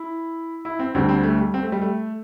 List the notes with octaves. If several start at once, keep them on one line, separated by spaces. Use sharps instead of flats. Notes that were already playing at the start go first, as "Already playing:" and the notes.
Already playing: E4
E4
C4
D2 D3 G3 C4
C4
A3
G3
C4
A3
G3
A3